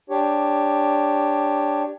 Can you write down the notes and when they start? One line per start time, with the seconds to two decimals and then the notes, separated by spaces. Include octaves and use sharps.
0.10 D4 G4 C#5